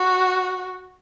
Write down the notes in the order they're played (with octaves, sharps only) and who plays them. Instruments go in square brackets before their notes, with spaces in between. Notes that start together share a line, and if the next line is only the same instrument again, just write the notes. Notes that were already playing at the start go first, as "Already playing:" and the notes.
Already playing: [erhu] F#4